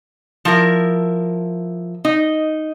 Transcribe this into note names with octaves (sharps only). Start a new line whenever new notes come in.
F3 E4 A#4
D#4